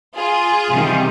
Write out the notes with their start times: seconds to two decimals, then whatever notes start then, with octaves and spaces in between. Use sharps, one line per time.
0.17 F4 G#4
0.70 C3 D#3 G3